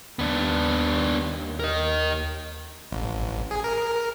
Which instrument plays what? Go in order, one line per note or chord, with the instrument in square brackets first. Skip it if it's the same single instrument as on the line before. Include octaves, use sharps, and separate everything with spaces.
[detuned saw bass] D#2 [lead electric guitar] B3 D4
[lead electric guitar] A#4 D#5
[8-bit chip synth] A1
G#4
A#4